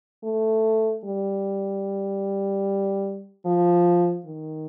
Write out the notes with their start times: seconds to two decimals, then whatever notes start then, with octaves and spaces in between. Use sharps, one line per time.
0.24 A3
1.05 G3
3.46 F3
4.26 D#3